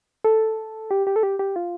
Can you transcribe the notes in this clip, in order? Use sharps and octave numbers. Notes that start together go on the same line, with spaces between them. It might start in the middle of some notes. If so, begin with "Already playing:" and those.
A4
G4
G4
A4
G4
G4
F4